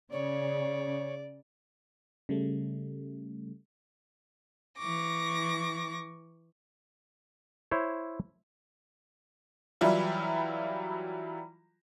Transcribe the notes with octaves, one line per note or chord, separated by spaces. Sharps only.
C#3 C#5 D5
C#3 G3 A3
E3 C#6 D6 A#6
E4 C5 C#5
E3 F#3 G3 E4 F4